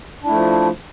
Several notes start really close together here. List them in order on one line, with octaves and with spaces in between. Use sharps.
D4 E4 A3 F3